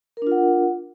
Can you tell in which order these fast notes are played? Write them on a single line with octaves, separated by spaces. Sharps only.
A#4 D4 F4 F#5